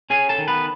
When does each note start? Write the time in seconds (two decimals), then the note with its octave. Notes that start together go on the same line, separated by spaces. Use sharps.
0.10 C#4 G#4 G#5
0.29 A4 A5
0.38 D#3
0.48 B3 B4